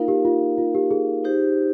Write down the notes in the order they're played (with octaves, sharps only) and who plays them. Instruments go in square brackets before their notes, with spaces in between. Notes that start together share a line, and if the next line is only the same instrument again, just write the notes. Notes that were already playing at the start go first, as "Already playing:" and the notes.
Already playing: [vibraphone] A#3 D#4 A#4 F5 [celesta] F4
[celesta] G4
F4
F4
G4
G#4
[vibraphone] D#4 G4 C5